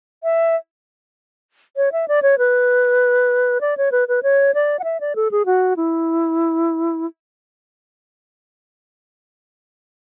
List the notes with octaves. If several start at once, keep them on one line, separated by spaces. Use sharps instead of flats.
E5
C#5
E5
D5
C#5
B4
D5
C#5
B4
B4
C#5
D5
F#5
E5
D5
A4
G#4
F#4
E4